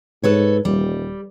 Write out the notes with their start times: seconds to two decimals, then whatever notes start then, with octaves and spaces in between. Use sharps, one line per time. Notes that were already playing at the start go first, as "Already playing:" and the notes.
0.24 G#2 A4 B4 C#5
0.65 D#1 G3